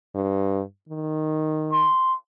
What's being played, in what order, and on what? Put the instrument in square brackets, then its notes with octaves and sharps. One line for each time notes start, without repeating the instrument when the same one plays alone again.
[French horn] G2
D#3
[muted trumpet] C6